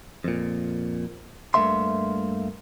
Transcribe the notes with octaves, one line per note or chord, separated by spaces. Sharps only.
F2 A#2
G2 F#3 A3 A#3 E5 C6